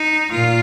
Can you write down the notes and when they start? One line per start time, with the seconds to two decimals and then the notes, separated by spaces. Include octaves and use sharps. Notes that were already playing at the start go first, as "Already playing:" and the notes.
Already playing: D#4
0.31 A#2 F4